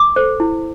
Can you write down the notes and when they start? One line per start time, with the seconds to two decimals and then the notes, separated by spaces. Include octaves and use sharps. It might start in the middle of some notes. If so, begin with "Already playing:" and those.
Already playing: D6
0.16 A4 C5
0.40 E4